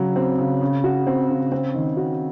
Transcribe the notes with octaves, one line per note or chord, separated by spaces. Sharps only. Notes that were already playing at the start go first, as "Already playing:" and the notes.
Already playing: C#3 F#3
C4
C#3
C#3
F#4
C4
C#3
C4
D#3
F#4